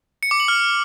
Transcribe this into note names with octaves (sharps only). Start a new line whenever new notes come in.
C#7
D6
F#7
F6